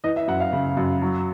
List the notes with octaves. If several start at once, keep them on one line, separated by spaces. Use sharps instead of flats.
E3 D#5
E5
F#2 F#5
F5
C#3
F#2
F#3